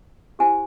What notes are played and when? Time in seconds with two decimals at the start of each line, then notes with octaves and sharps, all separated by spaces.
0.39 E4 G4 C5 G#5